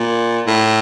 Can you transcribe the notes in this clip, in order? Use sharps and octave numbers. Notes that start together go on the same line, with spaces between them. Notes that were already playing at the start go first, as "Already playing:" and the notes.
Already playing: A#2
A2